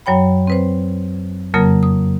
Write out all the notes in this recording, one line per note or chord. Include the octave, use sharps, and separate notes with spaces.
F#2 F#3 C#5 G5 B5
C4 B4 C5
F2 C#3 F#3 A#3 A#4 D#6
D#6